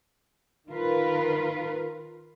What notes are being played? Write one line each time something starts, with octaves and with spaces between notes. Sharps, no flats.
D#3 F4 A#4 B4